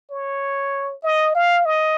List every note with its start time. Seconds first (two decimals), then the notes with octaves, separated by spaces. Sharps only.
0.11 C#5
1.03 D#5
1.35 F5
1.66 D#5